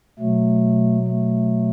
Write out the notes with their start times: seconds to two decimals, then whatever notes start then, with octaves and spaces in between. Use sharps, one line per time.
0.19 B2 F#3 A3
1.07 A3